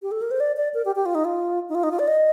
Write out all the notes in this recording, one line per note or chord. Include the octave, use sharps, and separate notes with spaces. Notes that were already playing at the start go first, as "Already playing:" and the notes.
G4
A4
A#4
C5
D5
D5
A#4
G4
G4
F4
D#4
F4
D#4
F4
D#4
F4
D5
D#5